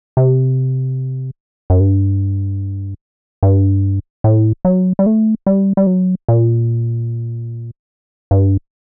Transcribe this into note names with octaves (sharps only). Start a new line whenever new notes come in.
C3
F#2
G2
G2
A2
F#3
G3
A3
G3
G3
F#3
A#2
G2